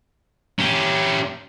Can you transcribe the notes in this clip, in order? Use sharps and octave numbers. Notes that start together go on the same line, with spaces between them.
C#4 G4